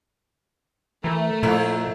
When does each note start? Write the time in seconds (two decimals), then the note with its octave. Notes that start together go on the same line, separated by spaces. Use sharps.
1.04 E3 A3 A#4
1.43 F2 A#2 E4 A#4